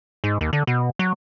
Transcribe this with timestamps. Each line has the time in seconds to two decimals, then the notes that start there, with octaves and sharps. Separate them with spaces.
0.24 G#2
0.41 D#2
0.53 D3
0.67 B2
0.99 F#3